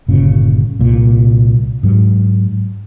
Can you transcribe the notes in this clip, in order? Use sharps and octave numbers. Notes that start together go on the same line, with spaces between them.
G1 A#2 C#3
C2 A#2
G#2 F#3